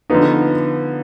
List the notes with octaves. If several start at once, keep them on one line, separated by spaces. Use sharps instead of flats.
D3 F3 B3 D#4